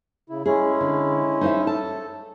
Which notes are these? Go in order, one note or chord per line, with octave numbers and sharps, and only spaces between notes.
C#3 E4
G#3 C#4 E4 G#4
D3
D#4 C5 E5
A4 A5